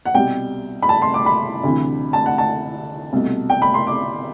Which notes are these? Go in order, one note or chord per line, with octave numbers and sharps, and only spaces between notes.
F#5
C2 B2 G3 G5
B5
A5
C6
D6
B5
D2 C3 E3
A5
F#5
A5
C2 B2 A3
G5
B5
C6
D6